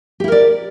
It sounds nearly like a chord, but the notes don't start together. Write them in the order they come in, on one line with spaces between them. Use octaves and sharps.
G4 E4 A#4 D5